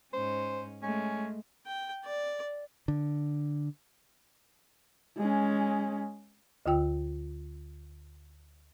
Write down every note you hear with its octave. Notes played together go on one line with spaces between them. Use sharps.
G#2 C#4 C5
G#3 A3 C#4
G5
D5
D3
G#3 C#4
D2 D3 F4 G5 E6